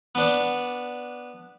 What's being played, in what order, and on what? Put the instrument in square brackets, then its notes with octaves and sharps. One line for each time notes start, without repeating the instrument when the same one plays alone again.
[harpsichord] B3 D4